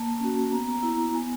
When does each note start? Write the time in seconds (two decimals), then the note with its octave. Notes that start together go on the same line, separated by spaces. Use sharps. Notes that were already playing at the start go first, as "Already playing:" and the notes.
Already playing: A#3 A5
0.20 C#4 F#4
0.51 B3 A#5
0.72 A#5
0.83 E4
1.14 B3 G#5